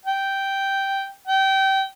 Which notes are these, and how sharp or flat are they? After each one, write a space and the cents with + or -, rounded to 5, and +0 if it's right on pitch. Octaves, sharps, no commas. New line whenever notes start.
G5 -5
G5 -25